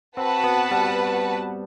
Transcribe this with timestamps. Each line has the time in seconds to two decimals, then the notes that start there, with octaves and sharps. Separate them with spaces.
0.16 C4 F#4 B4 F#5 A5
0.44 B3
0.71 G3